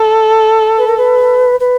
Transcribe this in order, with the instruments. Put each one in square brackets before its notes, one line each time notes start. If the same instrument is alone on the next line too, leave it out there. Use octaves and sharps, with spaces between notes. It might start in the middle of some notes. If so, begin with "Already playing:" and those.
Already playing: [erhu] A4
[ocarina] B4
A#4
B4
B4